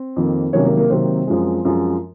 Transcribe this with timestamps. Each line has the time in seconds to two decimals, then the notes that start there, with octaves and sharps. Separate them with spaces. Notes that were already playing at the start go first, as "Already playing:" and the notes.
Already playing: C4
0.16 F2 D#3 A#3
0.53 C3 D#3 F#3 A#3 C#4 C#5
0.65 A#3 A#4
0.77 A#3 A#4
0.90 C3 D#3 F#3 A#3 C4 C5
1.27 F#2 F3 G#3
1.65 F#2 F3 G#3